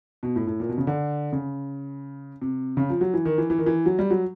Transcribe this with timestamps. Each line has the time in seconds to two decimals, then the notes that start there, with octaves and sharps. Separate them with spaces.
0.23 B2
0.36 A2
0.47 A2
0.60 A#2
0.69 B2
0.78 C#3
0.87 D3
1.33 C#3
2.42 C3
2.77 C#3
2.90 F3
3.01 F#3
3.14 E3
3.25 D#3
3.38 E3
3.50 E3
3.58 D#3
3.66 E3
3.86 F#3
3.99 G3
4.11 F#3